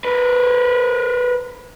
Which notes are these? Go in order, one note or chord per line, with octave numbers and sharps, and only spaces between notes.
A#4 B4